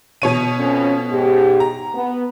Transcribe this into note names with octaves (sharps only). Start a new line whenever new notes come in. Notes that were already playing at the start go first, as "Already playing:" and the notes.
B2 C#5 D#7
F2 B3 C#4
G#2 G4
A#5
B3